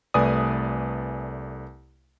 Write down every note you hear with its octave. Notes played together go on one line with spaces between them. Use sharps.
C2 A3 B4 D5 G#5 D#6